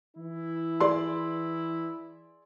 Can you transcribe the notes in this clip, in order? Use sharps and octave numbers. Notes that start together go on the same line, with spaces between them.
E3 E4
G#4 D5 C6